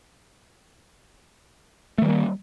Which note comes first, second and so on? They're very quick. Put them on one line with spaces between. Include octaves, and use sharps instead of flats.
A3 D#3 G3 A#3